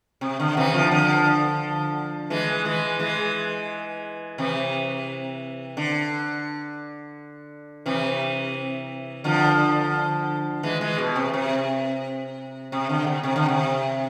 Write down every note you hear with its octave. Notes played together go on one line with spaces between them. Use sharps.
C3
D3
C3 E3
D3 F3
D3 F3
E3 G#3
E3 G#3
E3 G#3
C3 E3
D3
C3 E3
D3 F3
E3 G#3
E3 G#3
B2
C3
C3
C3
D3
C3
C3
D3
C3